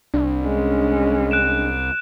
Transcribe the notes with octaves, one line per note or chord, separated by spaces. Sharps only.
C2 D4
G#3 C#4
F#6 D7 E7